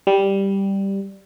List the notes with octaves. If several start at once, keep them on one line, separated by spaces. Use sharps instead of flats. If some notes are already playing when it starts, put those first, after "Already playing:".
G3